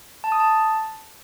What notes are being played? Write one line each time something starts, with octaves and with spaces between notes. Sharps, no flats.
A5
D#6
A5